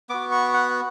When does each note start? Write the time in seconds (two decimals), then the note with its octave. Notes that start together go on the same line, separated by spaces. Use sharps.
0.09 B3 F#4 D6
0.32 C#6
0.54 F#5